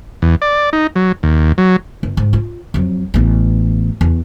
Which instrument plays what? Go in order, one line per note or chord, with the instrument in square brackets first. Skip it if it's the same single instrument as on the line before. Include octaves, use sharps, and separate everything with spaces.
[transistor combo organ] E2
D5
D#4
F#3
D#2
F#3
[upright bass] G1
G#2
F4
F2 F#3
A1 B3
E2